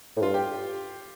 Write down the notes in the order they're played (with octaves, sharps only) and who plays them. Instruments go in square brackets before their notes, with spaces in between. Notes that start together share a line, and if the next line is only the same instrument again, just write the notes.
[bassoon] A2
[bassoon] G2 [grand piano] F4
[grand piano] G4